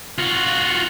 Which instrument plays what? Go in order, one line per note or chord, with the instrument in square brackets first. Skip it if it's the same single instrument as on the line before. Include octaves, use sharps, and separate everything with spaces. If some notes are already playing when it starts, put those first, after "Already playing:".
[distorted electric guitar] F4 F#4